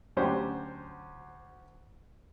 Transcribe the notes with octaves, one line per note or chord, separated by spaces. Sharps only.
D2 F#3 C#4 G4 C5